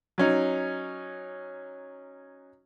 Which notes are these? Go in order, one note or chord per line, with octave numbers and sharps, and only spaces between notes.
F#3 C#4 D#4